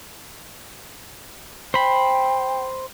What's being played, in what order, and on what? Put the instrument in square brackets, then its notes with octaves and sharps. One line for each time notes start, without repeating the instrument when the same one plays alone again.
[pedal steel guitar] C5 B5 [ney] G5